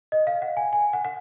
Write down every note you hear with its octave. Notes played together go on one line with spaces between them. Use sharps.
D#5
F5
F#5
G#5
G#5
F#5
F#5